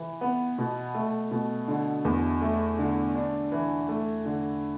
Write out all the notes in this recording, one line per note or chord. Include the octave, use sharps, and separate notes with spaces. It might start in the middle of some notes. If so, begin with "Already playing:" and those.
Already playing: E3
B3
B2
A3
B2
D3
E2
A3
D3
D4
E3
A3
D3